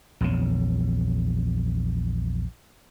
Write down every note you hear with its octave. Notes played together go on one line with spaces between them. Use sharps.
A#1 E2 C#3